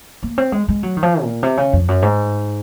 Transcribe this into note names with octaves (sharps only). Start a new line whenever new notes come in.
A#3
C4
G#3
G#3
F#3
D#3
F3
A#2
C3
C#3
F2
F#2
G#2